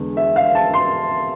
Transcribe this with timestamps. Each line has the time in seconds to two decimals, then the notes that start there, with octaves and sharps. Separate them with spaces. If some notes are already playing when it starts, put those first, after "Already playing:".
Already playing: E2 D3 G#3 B3
0.17 E5
0.36 F5
0.55 A5
0.74 C6